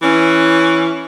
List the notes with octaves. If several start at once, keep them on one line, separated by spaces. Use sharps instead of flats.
E3 C#4